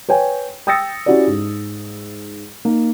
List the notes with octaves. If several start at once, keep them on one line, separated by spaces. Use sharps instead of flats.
B4 C#5 G5 G#5
G5 D#6 E6 A6 A#6 C#7
C#4 E4 F#4 G4 D5
G#2
A#3 D#4